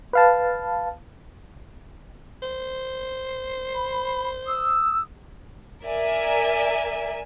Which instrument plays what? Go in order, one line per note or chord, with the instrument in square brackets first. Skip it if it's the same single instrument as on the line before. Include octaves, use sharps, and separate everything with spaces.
[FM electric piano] B4 F5 A5
[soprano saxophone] C5
[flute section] B5
D#6 E6
[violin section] A#4 D5 E5 G#5